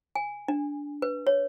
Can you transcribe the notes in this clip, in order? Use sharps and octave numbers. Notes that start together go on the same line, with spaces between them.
G#5
D4
B4
C#5